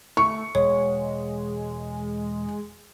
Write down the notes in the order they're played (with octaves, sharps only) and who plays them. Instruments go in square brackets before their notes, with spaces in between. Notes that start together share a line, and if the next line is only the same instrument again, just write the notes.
[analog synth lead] A3 [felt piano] C#6
[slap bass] E1 [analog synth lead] G#3 [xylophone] C#5